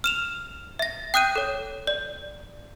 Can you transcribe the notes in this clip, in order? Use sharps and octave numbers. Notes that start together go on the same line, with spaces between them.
F6 E7 F7
E5 A#6
G5 D#6 F#6 G6 D#7
A4 C#5
D5